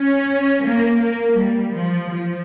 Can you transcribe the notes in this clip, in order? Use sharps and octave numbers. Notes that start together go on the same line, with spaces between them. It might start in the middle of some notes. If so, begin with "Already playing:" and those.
Already playing: C#4
A#3
A#3
G3
F3
F3